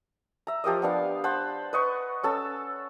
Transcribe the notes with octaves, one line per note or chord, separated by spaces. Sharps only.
E5 A#5
F3 G4 A#4 D#5
B3 D4 F5
C5 F#5 A5 B5
B4 D#5 C#6
C#4 A4 A5 E6